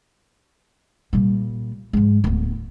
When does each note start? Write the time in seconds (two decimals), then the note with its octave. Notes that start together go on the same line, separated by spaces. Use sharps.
1.13 A#2 G3
1.93 G#2 F3
2.24 D1 B3